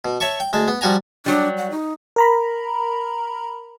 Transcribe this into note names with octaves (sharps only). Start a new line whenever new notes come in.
B2
C#5 E5 A5 C#6
G5
D2 G#3 A5
B3
F3 G3 F#4 G#5 A#5
F#3 G3 D4
F#5
D#4
A#4 A#5 B5